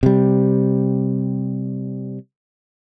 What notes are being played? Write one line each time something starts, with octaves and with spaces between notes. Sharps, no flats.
C3 G3